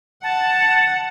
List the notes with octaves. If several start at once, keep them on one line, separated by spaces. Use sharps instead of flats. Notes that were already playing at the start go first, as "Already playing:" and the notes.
F#5 A5